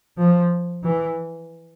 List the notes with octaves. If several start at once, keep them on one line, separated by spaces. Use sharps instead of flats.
F3
E3